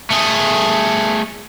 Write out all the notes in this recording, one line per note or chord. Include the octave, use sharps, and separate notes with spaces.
A3 G#4